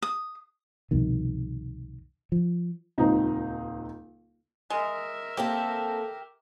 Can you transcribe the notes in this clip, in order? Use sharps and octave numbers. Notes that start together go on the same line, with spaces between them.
D#6
C2 F2 B2 D#3
F3
D#1 C#2 C4 D#4 A#5
G#3 A#4 E5
A#3 C4 G4 A4